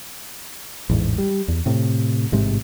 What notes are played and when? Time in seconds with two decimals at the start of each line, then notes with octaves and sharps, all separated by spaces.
0.89 A1 E2 G#2
1.18 G3
1.48 E2
1.66 A2 C3
2.32 A1 G#2 C3 G#3